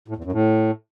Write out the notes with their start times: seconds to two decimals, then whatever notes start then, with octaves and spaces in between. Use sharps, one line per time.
0.08 A2
0.16 E2
0.24 F#2
0.32 A2